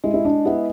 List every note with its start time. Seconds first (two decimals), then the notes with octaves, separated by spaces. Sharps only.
0.04 G#3 E4
0.14 E4
0.25 D4
0.45 B3 E4